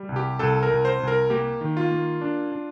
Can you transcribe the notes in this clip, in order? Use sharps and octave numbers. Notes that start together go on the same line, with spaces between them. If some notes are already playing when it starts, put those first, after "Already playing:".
Already playing: G3
C2
G4
C2 A4
A#4
C2
C5
C2
A#4
A#3 G4
D#3
F4
A#3
D4
D4